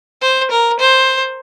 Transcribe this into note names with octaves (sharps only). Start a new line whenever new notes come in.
C5
A#4
C5